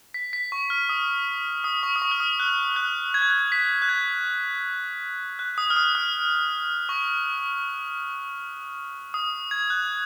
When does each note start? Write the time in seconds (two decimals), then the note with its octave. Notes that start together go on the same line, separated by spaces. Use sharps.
0.14 B6
0.33 B6
0.52 C#6
0.70 F6
0.89 D#6
1.64 D#6
1.83 C#6
1.96 D#6
2.02 C#6
2.11 F6
2.20 D#6
2.40 F#6
2.76 F#6
3.14 G#6
3.22 F#6
3.30 G#6
3.52 B6
3.82 F#6
3.89 G#6
5.39 F#6
5.58 D#6
5.70 F6
5.76 D#6
5.95 F6
6.89 C#6
9.14 D#6
9.51 G#6
9.70 F#6